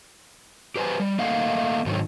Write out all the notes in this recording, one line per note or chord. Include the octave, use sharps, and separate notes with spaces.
G4 B4 C5 G#5
G3
A3 A#3 D#5 F5 F#5
G#2 D#3 F#3